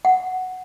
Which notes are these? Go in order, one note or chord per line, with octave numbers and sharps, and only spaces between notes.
F#5